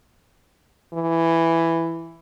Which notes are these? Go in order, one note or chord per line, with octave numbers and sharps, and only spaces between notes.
E3